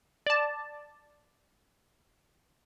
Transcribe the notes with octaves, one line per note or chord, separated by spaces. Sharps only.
D5 A5